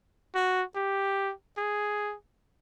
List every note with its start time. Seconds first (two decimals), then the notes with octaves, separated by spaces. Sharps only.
0.35 F#4
0.76 G4
1.58 G#4